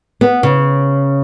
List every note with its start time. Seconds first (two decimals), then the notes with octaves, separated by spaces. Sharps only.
0.21 B3
0.43 C#3